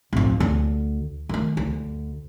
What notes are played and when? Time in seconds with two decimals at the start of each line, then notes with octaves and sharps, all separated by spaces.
0.13 D1 F2
0.40 D2
1.29 D#3 A3
1.57 D2